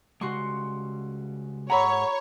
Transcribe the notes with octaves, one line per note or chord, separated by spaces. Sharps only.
C#3 G3 G#3 F#4 C6 C#6
G#2 A4 C#5 F#5 A#5 B5